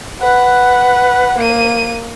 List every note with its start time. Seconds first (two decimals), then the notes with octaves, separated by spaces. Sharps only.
0.21 B4 F#5
1.38 A#3 D#7